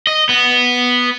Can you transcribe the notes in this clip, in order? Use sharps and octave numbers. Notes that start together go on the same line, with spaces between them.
D#5
B3